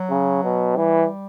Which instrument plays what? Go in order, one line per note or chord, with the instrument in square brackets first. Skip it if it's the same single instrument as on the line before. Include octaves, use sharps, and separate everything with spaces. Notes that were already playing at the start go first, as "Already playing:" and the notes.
Already playing: [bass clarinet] F#3
[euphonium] C#3
B2
[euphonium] E3 [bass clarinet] G3